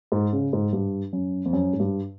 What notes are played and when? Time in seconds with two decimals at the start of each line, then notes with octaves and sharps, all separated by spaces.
0.12 G#2
0.33 C#3
0.53 G#2
0.73 G2
1.13 F#2
1.46 F2
1.53 F#2
1.73 G#2
1.80 G2